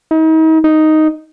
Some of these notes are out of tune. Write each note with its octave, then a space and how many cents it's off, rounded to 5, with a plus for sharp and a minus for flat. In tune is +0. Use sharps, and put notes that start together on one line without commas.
D#4 +40
D#4 +0